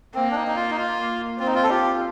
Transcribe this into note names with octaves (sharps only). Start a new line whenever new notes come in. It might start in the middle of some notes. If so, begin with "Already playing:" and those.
A#3 C4
D4
D#4
D#4
F4
D#4
F4
C4 F4
D#4
F4
A4
F4 G4